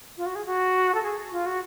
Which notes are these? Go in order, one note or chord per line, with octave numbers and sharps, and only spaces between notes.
F4
F#4
G#4
F#4
A4
G#4
F4
F#4